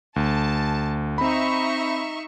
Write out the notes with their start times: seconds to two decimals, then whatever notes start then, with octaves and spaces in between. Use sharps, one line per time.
0.16 D2 A5
1.18 C4 D#4 E5 B5 C#6